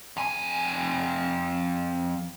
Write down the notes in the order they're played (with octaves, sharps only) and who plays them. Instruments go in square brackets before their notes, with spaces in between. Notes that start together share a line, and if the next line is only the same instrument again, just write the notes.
[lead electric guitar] F2 G#5